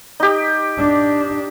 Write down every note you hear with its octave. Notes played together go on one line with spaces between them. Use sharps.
D#4 G4
D4